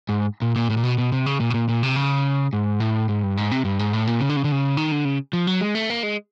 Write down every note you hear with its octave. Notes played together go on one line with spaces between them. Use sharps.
G#2
A#2
A#2
A2
A#2
B2
B2
C3
C#3
A#2
B2
A#2
A#2
C3
C#3
G#2
A2
G#2
G2
G#2
C3
G2
G#2
A2
A#2
C#3
D3
C#3
D3
C#3
D#3
D3
C#3
F3
F#3
G#3
A3
A#3
G#3